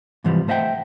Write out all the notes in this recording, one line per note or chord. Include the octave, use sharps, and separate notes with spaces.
G#2 C3 E3 F3 G3
A3 C5 D#5 E5 F#5 G5